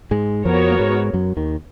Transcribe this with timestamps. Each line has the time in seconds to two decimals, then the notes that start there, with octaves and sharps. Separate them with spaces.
0.11 G#2 G#3
0.45 F2 F3 B3 F#4 A#4 C#5
0.71 A#3
0.79 G#2 G#3
1.13 F#2 F#3
1.37 D#2 D#3